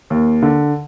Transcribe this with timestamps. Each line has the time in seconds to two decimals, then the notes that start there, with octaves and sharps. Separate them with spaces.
0.10 D#2
0.42 D3